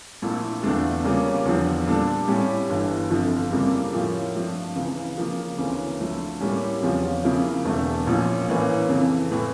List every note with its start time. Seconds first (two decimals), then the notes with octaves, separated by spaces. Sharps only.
0.22 A#1 A#2 A3 E4 A4
0.62 E2 D3 A3 D4 F4
1.04 C#3 G3 A#3 C#4 F4
1.45 E2 D3 F3
1.87 A#2 G3 D4 A4
2.28 A2 G3 C#4 G4
2.69 G1 G2 E3
3.10 G1 F2 D3 F3
3.52 F2 C#3 G3 A#3 E4
3.93 A2 F3 C#4 F4 A#4
4.35 G2 F3 A3 D4
4.76 C#2 C#3 E3
5.18 C#3 F3 A#3
5.58 D2 C#3 E3 A#3 C#4
6.00 D2 D3 F3 A3
6.41 A2 G3 A#3 C#4 G4
6.82 E2 C#3 F3 C#4 F4
7.24 C#3 F3 A#3 E4
7.65 E1 E2 D3 A3
8.07 A#1 A#2 F3 C#4
8.48 A#1 A2 E3 A#3 C#4
8.89 F2 C#3 E3
9.31 A2 E3